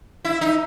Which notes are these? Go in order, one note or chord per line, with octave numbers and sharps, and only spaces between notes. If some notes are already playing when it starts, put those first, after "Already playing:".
E4
D#4